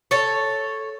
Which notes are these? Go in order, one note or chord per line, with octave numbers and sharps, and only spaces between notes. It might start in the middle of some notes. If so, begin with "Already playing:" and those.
A4 C#5